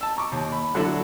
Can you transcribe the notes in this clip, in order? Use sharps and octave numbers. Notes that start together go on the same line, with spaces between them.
A5 E6
A#5 C#6 D6
D#2
B5
D3 F#3 D4 E4 F#4 A4